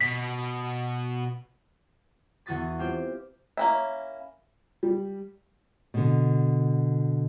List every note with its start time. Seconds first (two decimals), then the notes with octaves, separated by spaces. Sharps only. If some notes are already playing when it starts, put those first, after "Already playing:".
0.01 B2 B6
2.46 E2 E3 F#4 D#6 A6 B6
2.78 C4 F4 G4 C5
3.57 A#3 C#4 E4
4.83 G3
5.94 B2 D3